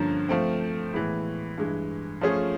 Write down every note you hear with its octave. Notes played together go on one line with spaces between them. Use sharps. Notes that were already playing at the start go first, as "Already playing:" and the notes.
Already playing: G2 D3 F3 A#3 C#4
F3 A3 C4
A2 E3 G#3 B3 E4
G2 E3 G#3
F3 A3 C#4 F4 G#4